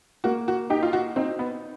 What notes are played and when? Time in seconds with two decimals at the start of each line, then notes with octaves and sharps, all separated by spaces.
0.24 A#3 F#4
0.48 F#4
0.70 D#4 G4
0.83 F4
0.93 F#4
1.16 C4 D#4
1.39 B3